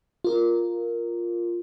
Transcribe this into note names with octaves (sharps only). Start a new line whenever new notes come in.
F4 A#4